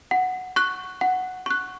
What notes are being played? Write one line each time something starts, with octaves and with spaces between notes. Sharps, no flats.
F#5
C#6 F#6
F#5
C#6 F#6